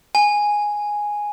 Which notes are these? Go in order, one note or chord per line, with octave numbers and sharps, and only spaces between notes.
G#5